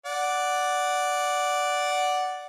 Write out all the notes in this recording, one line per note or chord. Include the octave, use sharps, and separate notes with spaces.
D5 F#5